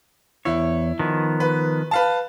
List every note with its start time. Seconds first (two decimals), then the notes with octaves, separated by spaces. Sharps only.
0.45 E2 E4 C#5
0.99 D#3 F3 B3
1.40 B4
1.91 B4 F5 A5